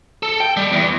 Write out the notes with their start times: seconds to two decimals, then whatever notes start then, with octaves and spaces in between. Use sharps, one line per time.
0.23 A4
0.40 G5
0.57 G3
0.72 E2